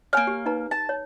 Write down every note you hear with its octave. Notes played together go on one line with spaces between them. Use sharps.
A#3 C#5 G#5 F6
G4
D#4 B4 A#5
A5
C#5